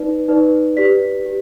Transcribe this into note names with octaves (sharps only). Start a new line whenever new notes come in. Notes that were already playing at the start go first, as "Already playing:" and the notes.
Already playing: D#4 B4 D5
D#4 B4 D5
G4 B4 D5 B6
G4